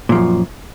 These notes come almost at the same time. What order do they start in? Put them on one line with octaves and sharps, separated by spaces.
A#2 F3 F#2